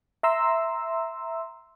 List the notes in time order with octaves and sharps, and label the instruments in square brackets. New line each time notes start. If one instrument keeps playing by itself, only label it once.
[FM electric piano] E5 A#5 C6 E6